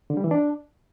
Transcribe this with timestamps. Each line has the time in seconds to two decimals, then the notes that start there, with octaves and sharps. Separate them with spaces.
0.10 D3
0.17 G3
0.24 E3
0.31 D4